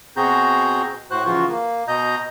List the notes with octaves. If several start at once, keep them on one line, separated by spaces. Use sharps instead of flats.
B2 C4 F#4 G#4 A#5 G6
A2 F#4 C5 F#6
C#3 E3 F3 F4 F#4
A#3
B2 D#5 A#5 G6